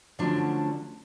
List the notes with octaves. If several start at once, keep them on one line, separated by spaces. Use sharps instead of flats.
D3 F3 F#3 A3 C#4 D4